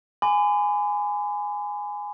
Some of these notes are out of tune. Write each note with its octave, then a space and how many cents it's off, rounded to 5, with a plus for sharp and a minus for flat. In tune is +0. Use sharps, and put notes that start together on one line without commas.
G#5 -5 B5 +45 D6 +0